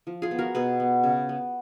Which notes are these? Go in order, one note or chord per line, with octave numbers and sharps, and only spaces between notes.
F3
F4 G#4
B3
F#4 A#4
B2 G#4 B4
B3
C#3
B3